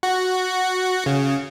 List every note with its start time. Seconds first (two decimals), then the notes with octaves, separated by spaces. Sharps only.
0.03 F#4
1.06 C#3